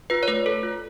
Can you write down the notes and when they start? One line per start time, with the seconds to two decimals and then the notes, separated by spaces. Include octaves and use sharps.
0.10 F4 B4
0.23 C#5
0.28 A3 B4
0.46 A4
0.63 F4